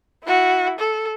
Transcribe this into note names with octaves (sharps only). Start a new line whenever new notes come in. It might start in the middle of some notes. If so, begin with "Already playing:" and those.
E4 F#4
A4